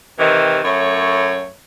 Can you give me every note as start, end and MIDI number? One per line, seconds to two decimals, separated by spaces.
0.18 0.59 48
0.18 0.59 51
0.18 0.59 52
0.64 1.48 42
0.64 1.48 57
0.64 1.48 73